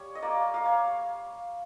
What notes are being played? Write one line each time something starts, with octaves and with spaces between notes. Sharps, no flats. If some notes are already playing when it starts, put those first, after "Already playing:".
Already playing: G3 C#5
D#5
A#3 D5
A#3 F5
C#5